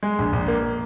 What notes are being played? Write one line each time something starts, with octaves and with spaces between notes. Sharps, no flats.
G#3
A#1
A#1
A#3